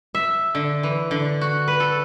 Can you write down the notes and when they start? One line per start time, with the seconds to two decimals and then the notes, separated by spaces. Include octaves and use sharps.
0.15 E5
0.55 D3
0.83 E3
1.11 D3
1.41 F#4
1.68 B4
1.80 A4